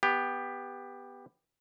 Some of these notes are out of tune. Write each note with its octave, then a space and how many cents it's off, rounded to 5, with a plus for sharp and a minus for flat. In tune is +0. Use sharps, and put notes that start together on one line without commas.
B3 +0 G4 +15